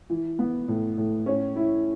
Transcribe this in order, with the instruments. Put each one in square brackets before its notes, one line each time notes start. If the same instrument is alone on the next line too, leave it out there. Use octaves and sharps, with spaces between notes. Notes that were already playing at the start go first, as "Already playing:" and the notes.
[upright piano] E3
B3
A2
A2
C#4
E4